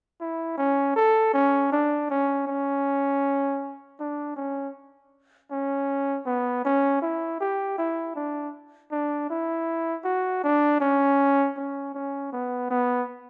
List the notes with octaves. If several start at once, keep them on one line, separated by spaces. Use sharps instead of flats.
E4
C#4
A4
C#4
D4
C#4
C#4
D4
C#4
C#4
B3
C#4
E4
G4
E4
D4
D4
E4
F#4
D4
C#4
C#4
C#4
B3
B3